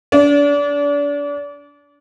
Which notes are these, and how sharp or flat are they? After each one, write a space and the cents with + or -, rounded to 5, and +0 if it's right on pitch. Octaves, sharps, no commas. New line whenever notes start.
D4 -35